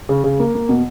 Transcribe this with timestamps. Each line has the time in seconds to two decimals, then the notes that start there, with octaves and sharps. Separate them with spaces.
0.09 C#3
0.24 C#3
0.40 A#3
0.55 A#3
0.69 B2